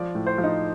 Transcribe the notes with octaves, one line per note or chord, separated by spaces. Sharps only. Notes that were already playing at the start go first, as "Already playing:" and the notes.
Already playing: F3 D5
A2
C5
F3
D#4